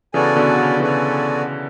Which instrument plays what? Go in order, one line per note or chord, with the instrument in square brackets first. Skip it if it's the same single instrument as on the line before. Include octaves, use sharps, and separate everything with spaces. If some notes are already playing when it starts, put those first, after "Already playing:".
[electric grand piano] C#3 E3 [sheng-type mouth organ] B3 F#4 A4 D5 G#5
[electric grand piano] B2 D3
C#3
[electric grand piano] C#3 E3 [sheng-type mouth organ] B3 F#4 A4 D5 G#5